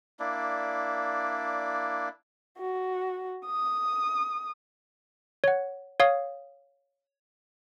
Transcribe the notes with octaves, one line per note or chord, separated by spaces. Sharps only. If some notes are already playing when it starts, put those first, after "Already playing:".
A#3 D4 E4 D5
F#4
D#6
C#5 F#5
C#5 F5 D#6